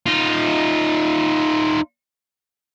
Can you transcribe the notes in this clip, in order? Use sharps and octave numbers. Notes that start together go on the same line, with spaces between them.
D#4 F4